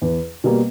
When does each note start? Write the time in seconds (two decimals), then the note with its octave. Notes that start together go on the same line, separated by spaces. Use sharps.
0.02 E2
0.44 B2 G3 A#3